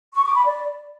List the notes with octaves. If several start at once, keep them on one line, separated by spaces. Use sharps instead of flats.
C#6
D6
B5
D5